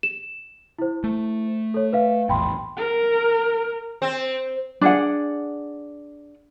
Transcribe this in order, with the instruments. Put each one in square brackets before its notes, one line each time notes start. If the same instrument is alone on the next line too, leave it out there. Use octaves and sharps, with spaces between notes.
[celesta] E7
E4 C5
[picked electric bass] A3
[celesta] A4 C#5
B4 E5 F5
[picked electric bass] A#1 E2 A2 [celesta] G5 B5 C6
[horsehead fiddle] A#4
[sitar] C4
[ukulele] D4 G#4 F#5